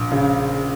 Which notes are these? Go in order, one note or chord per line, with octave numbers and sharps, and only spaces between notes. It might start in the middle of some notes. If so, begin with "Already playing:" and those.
Already playing: A#1
C#3